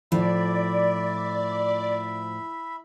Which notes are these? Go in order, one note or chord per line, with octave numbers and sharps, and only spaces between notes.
A2 F3 D5 E5 B5